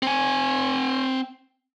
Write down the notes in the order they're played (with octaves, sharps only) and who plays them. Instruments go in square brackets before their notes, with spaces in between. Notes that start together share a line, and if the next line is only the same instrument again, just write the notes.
[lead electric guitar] C4 G#5